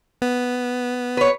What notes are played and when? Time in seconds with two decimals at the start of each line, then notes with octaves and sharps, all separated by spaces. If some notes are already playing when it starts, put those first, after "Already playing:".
0.22 B3
1.17 B4 C#5